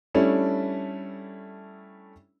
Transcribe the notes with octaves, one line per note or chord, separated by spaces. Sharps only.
G3 A3 C#4 D4 E4